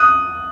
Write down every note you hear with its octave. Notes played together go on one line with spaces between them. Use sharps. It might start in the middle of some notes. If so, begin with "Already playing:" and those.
Already playing: D#6 F#6